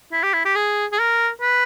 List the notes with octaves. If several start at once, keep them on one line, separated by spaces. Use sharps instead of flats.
E4
G4
E4
G4
G#4
G#4
A#4
B4